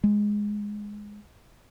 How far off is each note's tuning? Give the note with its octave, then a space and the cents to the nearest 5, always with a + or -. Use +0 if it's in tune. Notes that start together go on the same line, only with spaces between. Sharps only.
G#3 +0